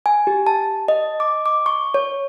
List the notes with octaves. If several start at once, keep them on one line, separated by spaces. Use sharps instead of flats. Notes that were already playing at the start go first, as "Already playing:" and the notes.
G#5
G4
A5
D#5
D6
D6
C#6
C#5